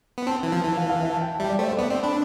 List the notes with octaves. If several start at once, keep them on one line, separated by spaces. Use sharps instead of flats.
B3
C4 A5
E3
F3
E3 A5
F5
F5
E5
A5
G5
G3 E5
D5
A3 C5
C5
B3 D5
C4 D5
D4 B5